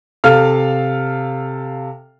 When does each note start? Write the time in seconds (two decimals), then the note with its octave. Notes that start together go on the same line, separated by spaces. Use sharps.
0.24 C3 A4 F5 F6